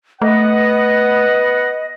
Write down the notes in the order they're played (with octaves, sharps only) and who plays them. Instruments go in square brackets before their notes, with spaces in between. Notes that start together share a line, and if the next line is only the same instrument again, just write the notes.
[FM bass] A3 [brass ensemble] B3 B4 F#5 [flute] D#5